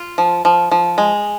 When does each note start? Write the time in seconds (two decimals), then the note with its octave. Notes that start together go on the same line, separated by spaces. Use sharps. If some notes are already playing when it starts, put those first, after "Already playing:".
Already playing: F4
0.18 F3
0.45 F3
0.72 F3
0.98 G#3